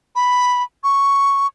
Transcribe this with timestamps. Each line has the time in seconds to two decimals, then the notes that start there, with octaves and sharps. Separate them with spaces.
0.16 B5
0.84 C#6